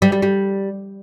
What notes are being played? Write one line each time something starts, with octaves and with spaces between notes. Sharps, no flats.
G3
G3
G3